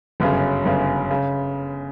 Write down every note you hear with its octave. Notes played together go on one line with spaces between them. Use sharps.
G1 F#2 C#3
G1 F#2 C#3
C#3